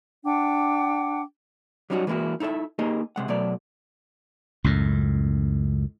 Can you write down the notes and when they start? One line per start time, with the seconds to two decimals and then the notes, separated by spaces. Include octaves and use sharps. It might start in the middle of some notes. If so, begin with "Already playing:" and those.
0.25 D4 F#5 G5 D6
1.90 F#3 G3 C#4 D#4 F#4
2.07 E3 G#3 A#3 E4 F#4
2.40 D#4 E4 A4 C5 E5
2.79 A#3 D#4 G4 G#4 A#4 D#5
3.16 C3 G#3 F#5
3.28 B2 F#3 A3 D5
4.64 C#2 F#2 A2